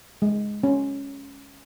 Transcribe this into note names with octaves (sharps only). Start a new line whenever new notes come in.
G#3
C#4